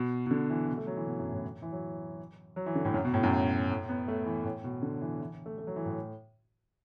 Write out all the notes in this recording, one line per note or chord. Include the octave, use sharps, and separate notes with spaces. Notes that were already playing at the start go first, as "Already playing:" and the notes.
Already playing: B2
B2
D3
E3
B2
A3
F#3
E3
B2
F#2
A2
E3
F#3
F#3
E3
D3
A2
F#2
B2
A2
F#2
A2
B3
A3
E3
A2
B2
D3
E3
E3
A3
A3
F#3
E3
A2